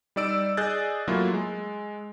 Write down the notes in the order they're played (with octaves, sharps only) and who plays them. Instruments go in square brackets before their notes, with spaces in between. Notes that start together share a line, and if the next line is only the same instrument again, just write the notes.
[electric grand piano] G3 D#4 D5 E6 D7
G#4 D5 D#5 F#6 G6 A6
F#3 A3 A#3 E4 F4
G#3